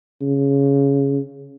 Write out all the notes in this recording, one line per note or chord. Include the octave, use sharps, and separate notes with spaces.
C#3